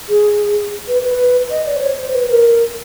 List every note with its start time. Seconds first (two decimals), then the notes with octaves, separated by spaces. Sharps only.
0.08 G#4
0.88 B4
1.03 B4
1.50 D#5
1.66 D5
1.76 C5
1.82 C#5
1.97 C5
2.13 B4
2.29 A#4